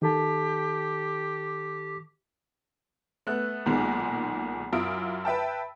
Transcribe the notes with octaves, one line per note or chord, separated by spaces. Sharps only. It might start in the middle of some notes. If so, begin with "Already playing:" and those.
D#3 G4 A4 A5
A3 B3 F#6
B1 A#2 D#3 G#3
F#2 E4 F4 D#6 E6 D7
B4 E5 G5 A5